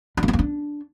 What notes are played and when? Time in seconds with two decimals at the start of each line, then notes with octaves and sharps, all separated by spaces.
0.17 D4
0.23 A#3
0.28 B3
0.33 A#3
0.39 D4